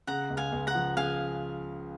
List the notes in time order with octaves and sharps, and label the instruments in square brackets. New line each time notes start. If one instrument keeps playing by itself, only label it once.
[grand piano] C#3 [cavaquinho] F#5 A#5
[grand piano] C#2
[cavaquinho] F5 G#5
[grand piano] C#2
[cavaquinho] F#5 A#5
[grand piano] F3
[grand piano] C#3 [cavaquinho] F5 G#5